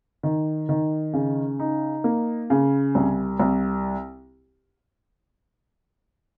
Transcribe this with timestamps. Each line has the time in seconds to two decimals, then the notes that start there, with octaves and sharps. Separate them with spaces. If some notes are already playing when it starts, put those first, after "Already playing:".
0.23 D#3
0.69 D#3
1.13 C#3
1.59 D#4
2.04 A#3
2.50 C#3
2.95 C2
3.40 C2